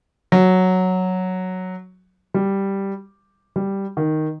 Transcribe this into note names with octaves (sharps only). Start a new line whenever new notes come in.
F#3
G3
G3
D#3